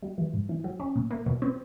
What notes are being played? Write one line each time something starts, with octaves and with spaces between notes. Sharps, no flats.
G3
E3
G#2
E3
F#3
C#4
A#2
A#3
B2
C4